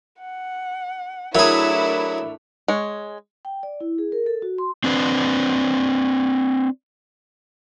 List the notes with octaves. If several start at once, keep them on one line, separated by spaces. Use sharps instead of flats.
F#5
F#3 A3 D4 E4 G#4 A#4 E5
G#3 C#5
G5
D5
E4
G#4
A#4
A4
F#4
C6
C4 D4 B4